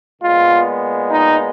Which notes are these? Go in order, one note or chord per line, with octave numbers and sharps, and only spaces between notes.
A#2 G#3 B3 F4
D#4